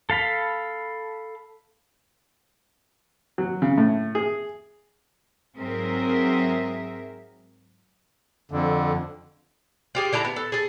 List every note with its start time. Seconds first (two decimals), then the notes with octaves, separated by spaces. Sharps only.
0.10 A4 F5 B5
3.38 F#3
3.62 C#3
3.78 A2
4.15 G#4
5.57 G#2 F#3 C4 G#4 A#4 E5
8.51 F2 D3
9.95 F4 G4 G#4
10.13 D3 E4 A5 A#5
10.24 B3
10.36 A4
10.52 G#4 A4